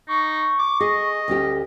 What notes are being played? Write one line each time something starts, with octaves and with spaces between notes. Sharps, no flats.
D#4 C#6
D6
G#4 D#5
D2 C#4 G4